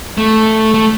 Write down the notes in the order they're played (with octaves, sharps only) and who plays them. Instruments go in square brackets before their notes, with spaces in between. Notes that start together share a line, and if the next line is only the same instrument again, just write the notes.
[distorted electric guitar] A3
A3